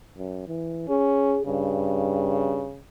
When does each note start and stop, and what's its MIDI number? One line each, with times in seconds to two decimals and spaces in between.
0.17 0.45 42
0.47 0.85 52
0.89 1.37 61
0.89 1.42 68
1.46 2.67 43
1.46 2.82 49